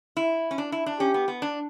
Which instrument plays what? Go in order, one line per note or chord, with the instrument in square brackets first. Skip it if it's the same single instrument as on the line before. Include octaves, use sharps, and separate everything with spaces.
[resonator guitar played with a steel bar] E4
C#4
D4
E4
D4
[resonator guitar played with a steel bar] C#4 [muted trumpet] G4
[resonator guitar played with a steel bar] B3
B3
D4